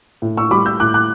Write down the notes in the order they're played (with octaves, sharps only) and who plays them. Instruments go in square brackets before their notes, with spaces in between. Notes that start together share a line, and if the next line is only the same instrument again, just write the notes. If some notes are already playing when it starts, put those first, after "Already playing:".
[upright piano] A2
C#6 E6
G3 B5 D6
E6 G6
A2 D6 F#6
D6 F#6